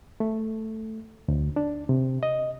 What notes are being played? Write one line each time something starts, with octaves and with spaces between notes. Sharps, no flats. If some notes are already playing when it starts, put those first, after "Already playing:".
A3
D2
D4
C3
D#5